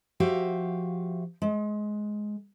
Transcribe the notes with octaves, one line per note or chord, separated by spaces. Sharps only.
F3 F#4 G4 E5 F5
G#3